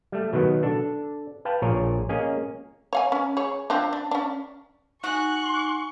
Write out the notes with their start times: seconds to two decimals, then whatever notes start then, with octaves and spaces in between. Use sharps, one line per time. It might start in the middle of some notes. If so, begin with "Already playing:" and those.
0.12 G3 A3
0.33 B2 D#3 F#3 B3
0.63 D4 A4
1.45 B4 F5 G5 A5
1.62 A#1 A#2 G#4 A#4 C#5
2.09 A#3 C#4 G#4 D#5
2.93 C#5 F5 G#5
3.12 C#4
3.37 G#4 C#5
3.70 F3 C4 D4
3.93 D4
4.11 C#4 D4
5.04 D#4 F#4 G#5 C#6 F#6